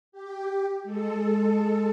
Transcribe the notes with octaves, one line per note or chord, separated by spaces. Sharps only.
G4
G#3 A4